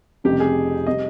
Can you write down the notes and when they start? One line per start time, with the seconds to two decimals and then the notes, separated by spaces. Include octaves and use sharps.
0.24 F1 F2 C#3 G3 G4
0.40 G#4
0.87 C3 G3 C4 D#5